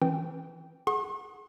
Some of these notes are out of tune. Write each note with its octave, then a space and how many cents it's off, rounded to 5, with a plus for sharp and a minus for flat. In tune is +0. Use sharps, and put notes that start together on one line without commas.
E3 +0 C#4 -40 G5 +0
G#4 +25 F#5 +0 C#6 -45